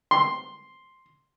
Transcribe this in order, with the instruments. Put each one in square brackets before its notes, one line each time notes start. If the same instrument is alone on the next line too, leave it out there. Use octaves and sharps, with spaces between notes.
[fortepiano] C6